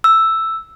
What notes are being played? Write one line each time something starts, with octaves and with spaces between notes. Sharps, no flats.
E6